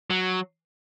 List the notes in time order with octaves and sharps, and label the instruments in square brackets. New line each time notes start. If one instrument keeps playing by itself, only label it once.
[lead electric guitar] F#3